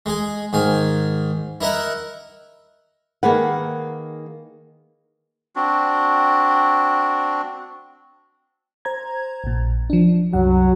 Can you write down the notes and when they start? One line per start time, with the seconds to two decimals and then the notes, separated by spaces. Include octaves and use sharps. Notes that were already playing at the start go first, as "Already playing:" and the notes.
0.06 G#3 G#4
0.53 G#2 D#3 G#5
1.61 E4 A#4 D#5 E5 F#5
3.23 D#3 A#3 G#4 B4 F#5
5.56 C4 D4 F#4
8.85 C5 A#5 G#6
9.44 A#1 A#2
9.90 F3 D4
10.33 C2 F#2 F#3 F#5